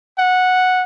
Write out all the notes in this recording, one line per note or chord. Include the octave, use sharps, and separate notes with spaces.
F#5